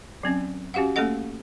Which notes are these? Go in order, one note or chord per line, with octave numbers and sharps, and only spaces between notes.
F#3 C4 C#4
C#4 F#4 G4 F5 F#5
A3 A#3 C#4 A4 D#5 F#5